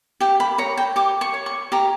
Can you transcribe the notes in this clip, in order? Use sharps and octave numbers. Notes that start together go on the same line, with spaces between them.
G4 G5
B5
C#5 A#5
G5
G4 D6
C#6
C#5
C#6
G4 A#5